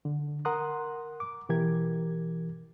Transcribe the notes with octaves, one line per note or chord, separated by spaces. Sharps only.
D3
A#4 F#5 A#5 C6 D#6 F#6
D6
B2 E3 G4 A#4 G#6